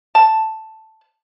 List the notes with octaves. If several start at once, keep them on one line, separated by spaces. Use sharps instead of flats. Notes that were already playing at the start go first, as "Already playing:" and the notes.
A5